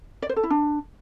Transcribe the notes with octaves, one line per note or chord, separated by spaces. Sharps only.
D5
C5
A4
E4
D4